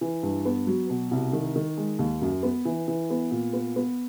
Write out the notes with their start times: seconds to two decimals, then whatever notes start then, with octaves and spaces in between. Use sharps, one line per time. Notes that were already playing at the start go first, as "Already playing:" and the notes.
0.01 E3
0.23 G2
0.45 B3
0.67 F#3
0.90 B2
1.11 C2
1.33 D#3
1.56 D#3
1.77 G#3
1.99 D#2
2.22 F#2
2.43 B3
2.65 E3
2.88 E3
3.10 B3
3.31 A#2
3.53 B3
3.76 B3